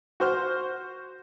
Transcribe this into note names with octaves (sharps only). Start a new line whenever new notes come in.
F#4 C5 F6